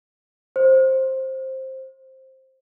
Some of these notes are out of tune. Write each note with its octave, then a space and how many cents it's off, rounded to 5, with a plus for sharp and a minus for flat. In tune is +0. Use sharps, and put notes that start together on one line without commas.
C5 +10